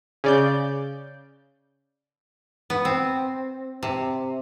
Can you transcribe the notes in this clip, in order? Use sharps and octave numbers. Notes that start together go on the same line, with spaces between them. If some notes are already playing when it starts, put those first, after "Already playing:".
C#3 D5 G6
B3
C4
C3